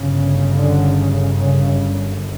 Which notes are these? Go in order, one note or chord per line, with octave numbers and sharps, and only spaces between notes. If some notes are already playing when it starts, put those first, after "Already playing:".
Already playing: G1 F#2 C#3
D3
C#3